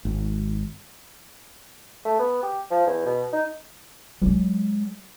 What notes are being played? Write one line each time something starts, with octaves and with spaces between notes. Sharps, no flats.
G#1
A3
B3
G4
F3
E2
B2
D#4
F#3 G#3